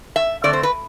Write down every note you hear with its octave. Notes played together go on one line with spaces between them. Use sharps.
E5
D3 A3 C4 D5
C5
B4